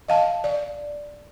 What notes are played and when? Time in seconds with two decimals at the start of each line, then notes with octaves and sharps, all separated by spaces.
0.08 D#5 F5 A5
0.44 D5